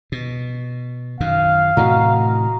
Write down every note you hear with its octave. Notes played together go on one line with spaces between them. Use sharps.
B2
F#2 D#3 F5
A2 C3 E3 F#4 A#4 D#5